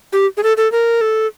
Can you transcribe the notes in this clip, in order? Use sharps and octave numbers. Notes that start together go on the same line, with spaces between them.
G4
G#4
A4
A4
A#4
A4